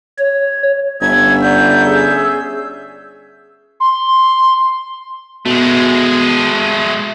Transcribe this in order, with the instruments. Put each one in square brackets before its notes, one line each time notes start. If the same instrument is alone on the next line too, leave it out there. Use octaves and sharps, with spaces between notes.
[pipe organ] C#5
[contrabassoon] G1 [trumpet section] C#4 E5 [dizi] G#6
[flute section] D5 F#5 A#5 [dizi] G6
[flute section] G#4 E6
[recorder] C6
[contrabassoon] B2 [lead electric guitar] G#3 A3